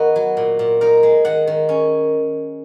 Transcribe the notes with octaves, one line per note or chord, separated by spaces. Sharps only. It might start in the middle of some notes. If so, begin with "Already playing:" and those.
Already playing: D#3 B3 D#4 F#4 G#4
F#3
A#2
A#2
D#4 A#4
G#3
D#3 F#5
D#3
C#4